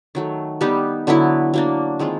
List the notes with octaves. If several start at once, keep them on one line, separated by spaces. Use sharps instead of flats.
D#3 F#3 A3
G3 B3 D#4 G4
D3 F#3 B3 E4
F#3 A#3 D4
D#3 G#3 C4 F4